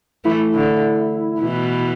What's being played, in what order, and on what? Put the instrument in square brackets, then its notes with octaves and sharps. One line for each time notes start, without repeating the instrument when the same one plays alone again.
[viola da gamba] E3 A3 [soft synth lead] E4
[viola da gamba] D3
B2 E3